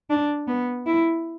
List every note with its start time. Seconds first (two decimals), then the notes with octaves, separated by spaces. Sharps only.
0.10 D4
0.48 B3
0.87 E4